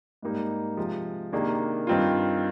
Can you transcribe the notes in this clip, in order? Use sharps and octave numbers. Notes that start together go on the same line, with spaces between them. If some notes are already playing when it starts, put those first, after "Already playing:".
G#2 G3 A#3 D#4
C3 F3 G#3
C3 D#3 A#3 D4 G#4
G2 D#3 G3 C4 F4